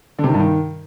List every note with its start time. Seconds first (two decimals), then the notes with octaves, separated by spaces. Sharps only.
0.19 D3
0.24 C3
0.29 D#3
0.34 G2
0.39 D#3